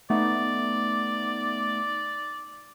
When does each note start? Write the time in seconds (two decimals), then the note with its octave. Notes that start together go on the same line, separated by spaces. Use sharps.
0.10 A3 B3 D#4 D5